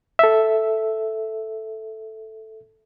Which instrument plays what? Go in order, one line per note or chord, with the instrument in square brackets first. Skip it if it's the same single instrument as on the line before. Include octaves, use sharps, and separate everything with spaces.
[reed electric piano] A4 E5